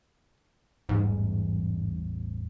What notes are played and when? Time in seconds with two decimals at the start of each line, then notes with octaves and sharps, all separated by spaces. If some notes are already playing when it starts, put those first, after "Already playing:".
0.89 A1 E2 G#2 G3